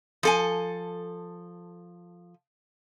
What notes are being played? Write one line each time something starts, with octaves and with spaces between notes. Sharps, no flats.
F3 A4 G#5